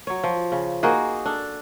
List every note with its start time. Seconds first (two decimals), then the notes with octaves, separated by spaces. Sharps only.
0.07 F#3 C#5
0.24 F3
0.52 C#3
0.83 A#3 D#4 F#4 G#4
1.26 D4 A4